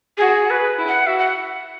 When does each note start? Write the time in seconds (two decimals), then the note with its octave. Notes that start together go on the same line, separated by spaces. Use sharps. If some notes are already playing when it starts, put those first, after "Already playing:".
0.18 F#4 G#4
0.50 B4
0.78 E4
0.88 F#5
1.07 F#4 E5
1.18 F#5